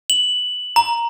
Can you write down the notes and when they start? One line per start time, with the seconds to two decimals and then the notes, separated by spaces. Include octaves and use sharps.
0.10 F#7
0.76 A#5